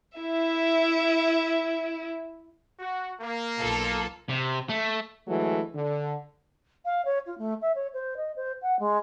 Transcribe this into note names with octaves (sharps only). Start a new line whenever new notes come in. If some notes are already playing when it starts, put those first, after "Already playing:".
E4 E5
F#4
A#3
B1 F4 A4
C3
A3
D2 E3 F#3 G#3 A3 F#4
D3
F5
C#5
F4
A3
E5
C#5
C5
D#5
C5
F#5
G#3